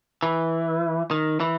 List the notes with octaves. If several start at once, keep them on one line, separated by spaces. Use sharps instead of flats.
E3
D#3
E3